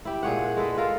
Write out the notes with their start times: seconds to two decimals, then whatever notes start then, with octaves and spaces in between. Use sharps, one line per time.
0.05 E4 G4
0.23 A#2 G#4 C#5 F#5
0.57 G#3 A4 B4 D#5
0.78 F4 A4 A#4